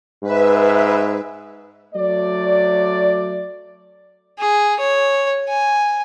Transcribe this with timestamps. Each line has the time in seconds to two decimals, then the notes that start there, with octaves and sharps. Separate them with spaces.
0.23 G#2 B4 E5
1.94 F#3 A3 D5
4.39 G#4
4.80 C#5
5.49 G#5